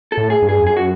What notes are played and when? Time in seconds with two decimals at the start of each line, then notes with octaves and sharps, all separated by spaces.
0.12 A4
0.17 A2
0.30 G#4
0.42 G2
0.49 G#4
0.59 F2
0.67 F#2 G#4
0.77 F#4